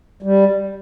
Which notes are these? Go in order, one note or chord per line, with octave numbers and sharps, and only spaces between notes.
G3